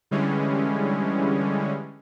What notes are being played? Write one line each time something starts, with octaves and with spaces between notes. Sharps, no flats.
D3 E3 G3 G#3 C#4